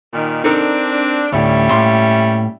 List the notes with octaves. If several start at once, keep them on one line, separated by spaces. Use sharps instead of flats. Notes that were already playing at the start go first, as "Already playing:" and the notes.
A#2 D#3
C4 D4 D#4 A4 A#4
D2 A2 D3 G3 C#4 E5
A2 A#3 C6